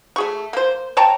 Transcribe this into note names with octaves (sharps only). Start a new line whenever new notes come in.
A3 G#4 C#6
A#3 C5
C#5 G5 A5 A#5